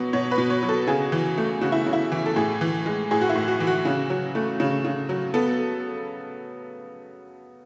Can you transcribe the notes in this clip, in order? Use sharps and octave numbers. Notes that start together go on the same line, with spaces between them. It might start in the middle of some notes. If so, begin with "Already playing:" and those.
Already playing: B2 F#3 B3
B2 C#5
B4
B2
C#5
F#3
A4
C#3 G#4
E3
A3
C#3 F#4
E4
C#3
E4
E3
A4
A2 G#4
E3
G#3
A2 G#4
F#4
E4
A2
F#4
E3
F#4
C#3
F#3
A3
C#3
C#3
F#3
B3 A4